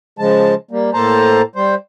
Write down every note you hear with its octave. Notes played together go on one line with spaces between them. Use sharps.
C#3 F3 G#3 A5
G3 A#3
A2 A#3 A4 C5 A5 A#5
G3 C5